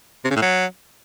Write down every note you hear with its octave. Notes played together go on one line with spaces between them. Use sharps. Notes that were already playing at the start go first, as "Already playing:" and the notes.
C3
C#3
A2
F#3